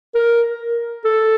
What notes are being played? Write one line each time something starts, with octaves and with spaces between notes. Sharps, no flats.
A#4
A4